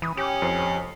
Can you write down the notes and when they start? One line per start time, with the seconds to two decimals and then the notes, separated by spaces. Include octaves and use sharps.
0.02 E3 B5 D#6
0.17 C#4 G4
0.42 F2 C5 C7